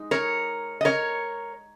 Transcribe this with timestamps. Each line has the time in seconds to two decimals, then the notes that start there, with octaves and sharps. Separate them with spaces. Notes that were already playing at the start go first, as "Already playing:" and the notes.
Already playing: G#3 D#4
0.11 A#4 C#5
0.81 D#5
0.85 A#4 C#5